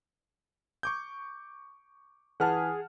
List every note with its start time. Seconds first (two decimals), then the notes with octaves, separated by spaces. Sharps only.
0.83 C#6 D6 G6
2.40 E3 G#4 B4 F#5 A5 F6